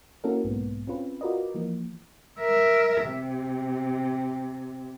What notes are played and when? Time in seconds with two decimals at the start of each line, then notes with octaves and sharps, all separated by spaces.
0.24 A#3 C#4 E4 F#4 A4 A#4
0.44 B1 G#2 A#3 B3
0.87 C4 C#4 F4 B4
1.21 F4 F#4 A#4 B4 D5 D#5
1.55 E3 F3 A#3
2.39 A#4 E5
3.05 C3